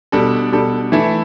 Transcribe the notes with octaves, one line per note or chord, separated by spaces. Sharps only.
B2 G3 D4 A4
B2 G3 D4 A4
E3 A3 E4